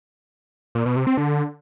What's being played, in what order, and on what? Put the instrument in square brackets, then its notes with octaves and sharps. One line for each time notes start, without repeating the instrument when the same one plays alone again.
[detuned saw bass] A#2
B2
C3
C4
D3